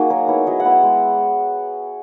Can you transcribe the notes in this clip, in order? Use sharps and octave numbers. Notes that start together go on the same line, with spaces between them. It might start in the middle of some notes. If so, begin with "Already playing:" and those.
Already playing: A#3 D#4 F#4 G#4 F#5
F#3 A#4
B3 E4 C#5
F#3 D#5
F#5
B3 E4
F#5
G#3